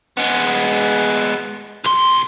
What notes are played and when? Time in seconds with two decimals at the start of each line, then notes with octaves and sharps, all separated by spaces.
0.17 G#3 B3
1.85 B1 C6